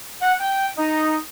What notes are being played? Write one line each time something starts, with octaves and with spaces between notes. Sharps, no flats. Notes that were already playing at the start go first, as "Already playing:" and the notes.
F#5
G5
D#4